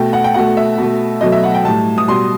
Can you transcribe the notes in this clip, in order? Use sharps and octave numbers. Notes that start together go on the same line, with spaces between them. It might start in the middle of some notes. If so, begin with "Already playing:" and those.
Already playing: B2 A3 G5
F#5
G5
B2 A3 F#5
E5
B2 A3
B2 F#3 A3 D#5
E5
F#5
G5
A2 G3 A5
D#6
B2 G3 C6